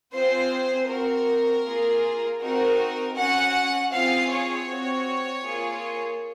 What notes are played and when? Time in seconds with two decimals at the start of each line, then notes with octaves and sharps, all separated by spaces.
0.13 C4 F4 G#4 C5
0.89 C4 F#4 A#4
1.65 A#3 F4 G#4
2.41 C4 D#4 F#4 A#4
3.16 C#4 F#4 F#5
3.92 C4 F4 G#4 F5
4.30 C#5
4.68 C4 F#4
5.44 A#3 F4 G#4